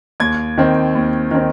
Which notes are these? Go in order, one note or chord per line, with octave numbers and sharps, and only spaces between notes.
D#2 G#6
D#3 C4
D#2
D#3 C4